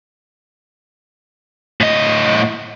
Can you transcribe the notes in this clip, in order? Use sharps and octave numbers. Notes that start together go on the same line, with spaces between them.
A2 D#5